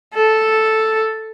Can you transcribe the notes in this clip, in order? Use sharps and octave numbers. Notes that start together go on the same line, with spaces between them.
A4